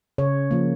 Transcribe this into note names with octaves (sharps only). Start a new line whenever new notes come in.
C#3 C#5
F3 A#3